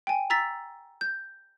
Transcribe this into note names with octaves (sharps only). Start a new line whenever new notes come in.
G5 G#5
A#5 E6 A6 B6
G6